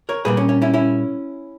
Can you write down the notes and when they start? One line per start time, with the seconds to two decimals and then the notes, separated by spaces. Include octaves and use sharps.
0.09 A#4 C#5
0.25 A#2 G3 A#3 G#4 B4
0.37 C#4
0.49 C#4
0.62 C#4 E4
0.74 C#4 E4